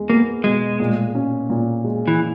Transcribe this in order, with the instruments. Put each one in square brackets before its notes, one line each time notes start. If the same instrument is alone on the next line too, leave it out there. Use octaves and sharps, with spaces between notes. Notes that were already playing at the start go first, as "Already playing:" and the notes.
Already playing: [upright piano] E2 G#3
[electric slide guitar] A#3 [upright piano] B3
[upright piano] B2 [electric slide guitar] G#3
[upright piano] A#2
C#4
A#2
G#3
[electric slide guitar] E3